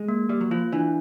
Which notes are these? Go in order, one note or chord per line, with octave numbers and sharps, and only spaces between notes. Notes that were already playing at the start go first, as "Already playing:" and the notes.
Already playing: G#3
A#3
G3 A#3
F#3
F3 F4
E3 D4